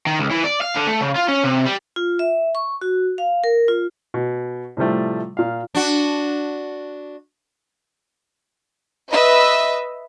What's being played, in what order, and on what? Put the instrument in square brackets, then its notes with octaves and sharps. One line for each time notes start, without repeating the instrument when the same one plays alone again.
[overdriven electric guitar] D#3
C#2
E3
D5
F5
D3
A3
C#3
F4
C#4
C3
G3
[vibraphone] F4
E5
C#6
F#4
F5
A#4
F4
[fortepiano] B2
A2 C3 F3 G3 A3
A#2 F5
[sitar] D4 F#4
[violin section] B4 D#5 E5